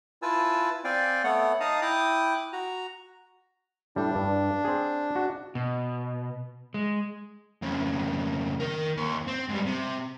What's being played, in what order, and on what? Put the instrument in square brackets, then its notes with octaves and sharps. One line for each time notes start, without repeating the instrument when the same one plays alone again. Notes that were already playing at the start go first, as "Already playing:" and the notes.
[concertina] E4 F4 B4 G#5 A5 E6
C4 D5 F5 G5 G#5
A3 B3 C#5 F#5
D#4 F5 A5 A#5 D#6
E4 G5 D6 D#6 F#6
F#4 A#5
[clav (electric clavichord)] A2 G3 [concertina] D4
[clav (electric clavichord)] G2
C4 G#4
F#4
[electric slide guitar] B2
G#3
[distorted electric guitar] F2 C#3
D#3 A#4
D#2 C6
C4
G#2 G3
C3